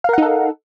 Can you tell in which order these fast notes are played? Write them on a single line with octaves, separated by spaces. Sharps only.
F5 A#4 F#5 D#4 A4